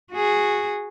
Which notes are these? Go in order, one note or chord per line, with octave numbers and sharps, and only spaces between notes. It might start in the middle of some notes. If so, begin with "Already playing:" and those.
F#4 G#4